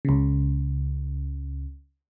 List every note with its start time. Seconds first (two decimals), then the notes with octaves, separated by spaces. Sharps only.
0.05 C#2 C#3